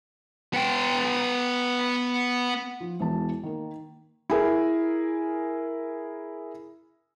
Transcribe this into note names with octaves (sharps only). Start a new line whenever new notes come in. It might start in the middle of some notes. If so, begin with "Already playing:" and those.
B3 G5
F3
E1 E3 B3 A5
D#3 A#3
E4 G#4 A#4